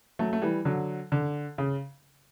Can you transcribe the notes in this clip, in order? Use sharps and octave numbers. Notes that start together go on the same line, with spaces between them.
F#3 A3
A3
E3 G3
D3 F#3
D3
C#3